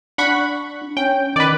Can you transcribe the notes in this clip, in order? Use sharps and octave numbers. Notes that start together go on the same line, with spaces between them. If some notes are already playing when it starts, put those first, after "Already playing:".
D4 F#5 B5 C#6
C#4 G5
D#3 B4 D5